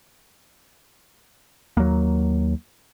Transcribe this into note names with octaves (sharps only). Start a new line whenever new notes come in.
D#2 F#3 A#3